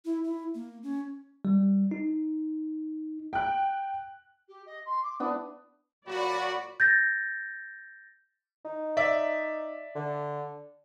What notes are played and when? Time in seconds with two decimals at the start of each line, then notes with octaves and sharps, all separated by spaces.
0.05 E4
0.24 E4
0.55 A#3
0.83 C#4
1.45 G3
1.91 D#4
3.33 G5 F#6
4.48 G4
4.66 D#5
4.85 C6
5.03 D6
5.20 B3 D4 E4
6.06 A#2 F#3 F#4 D5 B5
6.80 G6 A6 A#6
8.65 D#4
8.97 D5 E5
9.95 D3